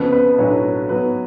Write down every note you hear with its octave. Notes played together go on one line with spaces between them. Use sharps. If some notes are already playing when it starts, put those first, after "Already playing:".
Already playing: F2 C#3 F3 B3 B4
B4
B1 A2 F#3 A3 D4 C#5
G#2 F#3 B3 F#4 B4